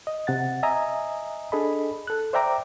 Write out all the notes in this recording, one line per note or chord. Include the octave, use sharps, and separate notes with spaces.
D#5
C3 F#5 A6
D#5 E5 G#5 A#5 D#6
D4 G#4 A4 D#5 B5
A4 F#6
C5 D5 E5 G5 A#5 D6